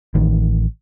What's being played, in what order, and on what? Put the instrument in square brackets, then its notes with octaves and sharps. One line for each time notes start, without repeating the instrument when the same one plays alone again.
[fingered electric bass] A1 D#3